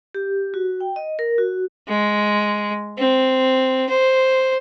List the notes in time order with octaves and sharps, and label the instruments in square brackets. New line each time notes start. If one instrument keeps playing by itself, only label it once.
[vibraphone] G4
F#4
G5
D#5
A#4
F#4
[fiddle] G#3
C4
C5